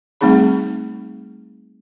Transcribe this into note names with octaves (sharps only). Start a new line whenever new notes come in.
G3 A3 C4 D#4 G#4 B5